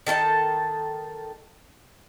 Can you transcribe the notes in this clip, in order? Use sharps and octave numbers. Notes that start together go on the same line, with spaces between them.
D#3 A4 C#5 A5